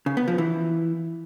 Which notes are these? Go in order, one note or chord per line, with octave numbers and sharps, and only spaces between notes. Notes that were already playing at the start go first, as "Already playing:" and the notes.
C#3
B3
F3
E3